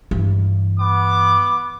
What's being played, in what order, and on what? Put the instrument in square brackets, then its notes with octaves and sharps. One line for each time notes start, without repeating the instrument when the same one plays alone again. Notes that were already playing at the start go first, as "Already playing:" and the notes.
[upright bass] G2 E3
[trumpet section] B3 D6